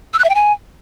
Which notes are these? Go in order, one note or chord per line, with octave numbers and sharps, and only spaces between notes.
E6
F#6
E5
G5
G#5